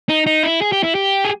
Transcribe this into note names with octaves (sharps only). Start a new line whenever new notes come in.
D#4
D#4
E4
G#4
G4
E4
G4
G#4